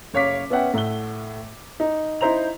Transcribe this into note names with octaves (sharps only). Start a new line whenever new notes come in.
F#1 C#5 F5 D6 B6
B3 C#4 E5 F#5 G5
A2 A3 F#5 G7
D#4
D#4 E4 C5 A#5 F7